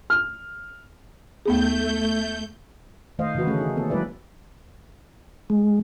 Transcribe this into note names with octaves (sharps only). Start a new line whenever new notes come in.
F6
D#2 A3 B3 G#4 G6
D#3 A3 C5 D#5 F5
C#3 E3 D#4 F#4 B4
D3 D#3 A3 C#4 G#4 A4
D#4
A#3 C4 A4
F#3 G#3 E4 B4 D5 E5
G#3